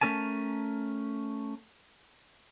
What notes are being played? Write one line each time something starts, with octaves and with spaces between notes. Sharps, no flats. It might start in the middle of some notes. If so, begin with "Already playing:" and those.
A3 C#4 A#4 G#5 A5